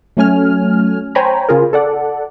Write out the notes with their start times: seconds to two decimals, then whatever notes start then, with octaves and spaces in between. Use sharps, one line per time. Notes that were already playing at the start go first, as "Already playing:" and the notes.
0.17 F#3 A3 C#4 G#5 F6
1.15 C5 C#5 G5 G#5 A#5 B5
1.49 C#3 F4 G#4 A#4
1.73 A4 D5 F#5